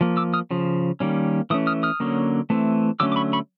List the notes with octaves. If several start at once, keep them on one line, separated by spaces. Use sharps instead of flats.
F3 A#3
D6 E6
D#6 F6
C#3 F3
D#3 G3 A#3 C#4
E3 A3 C#4 D#6
D#6 F6
D#6 F6
D3 F#3 A#3 C#4
E3 A3 C4
D3 F#3 A3 C#4 D6 E6
D6
B5 C#6
B5 C#6